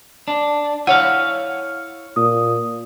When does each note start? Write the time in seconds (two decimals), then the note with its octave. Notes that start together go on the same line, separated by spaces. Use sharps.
0.28 D4
0.87 E4 C#5 F5 F#5
2.16 A#2 D#6